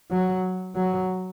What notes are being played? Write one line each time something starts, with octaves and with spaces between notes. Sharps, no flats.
F#3
F#3